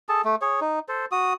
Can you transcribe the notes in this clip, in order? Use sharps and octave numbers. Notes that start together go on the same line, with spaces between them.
G#4 A4 A5
A3
G#4 C#5
D#4
A4 C5
F#4 D#6